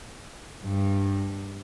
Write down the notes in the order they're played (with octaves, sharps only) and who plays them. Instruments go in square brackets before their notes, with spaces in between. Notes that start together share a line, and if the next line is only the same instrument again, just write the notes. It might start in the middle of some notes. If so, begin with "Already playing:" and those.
[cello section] G2